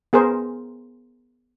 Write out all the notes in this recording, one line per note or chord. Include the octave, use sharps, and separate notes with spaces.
B3 G#4 A#4 C5